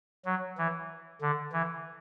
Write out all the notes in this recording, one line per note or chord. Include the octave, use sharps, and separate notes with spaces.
F#3
E3
D3
E3